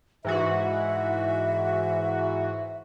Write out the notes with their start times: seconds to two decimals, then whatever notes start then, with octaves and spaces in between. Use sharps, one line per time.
0.25 G#2 E3 F#4 E5